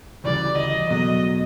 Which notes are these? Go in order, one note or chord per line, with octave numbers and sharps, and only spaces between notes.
D2 C#3 E3 G3 D5
D#5
E2 B2 F#3 A3 D#5